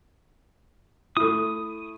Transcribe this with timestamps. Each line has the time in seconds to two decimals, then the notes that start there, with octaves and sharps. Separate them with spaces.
1.17 A3 E4 D#6